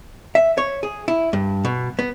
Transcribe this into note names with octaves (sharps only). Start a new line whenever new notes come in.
E5
C#5
G#4
E4
G2
B2
B3